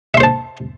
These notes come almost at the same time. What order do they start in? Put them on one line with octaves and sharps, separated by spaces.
E5 C6 C5 A5